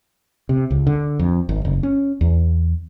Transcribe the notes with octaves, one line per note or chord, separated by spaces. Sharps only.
C3
C#2
D3
F2
G#1
F#1
C#4
E2